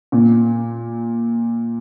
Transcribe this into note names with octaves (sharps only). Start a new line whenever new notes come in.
A#2